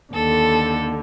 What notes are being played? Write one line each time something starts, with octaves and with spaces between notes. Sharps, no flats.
D#2 D3 A4